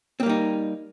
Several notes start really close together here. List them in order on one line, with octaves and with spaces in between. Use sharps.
C4 A#3 G3 D#4